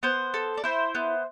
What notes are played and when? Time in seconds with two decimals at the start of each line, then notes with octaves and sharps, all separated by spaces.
0.03 B3 C5
0.34 A4
0.57 D5
0.64 E4 C5
0.95 B3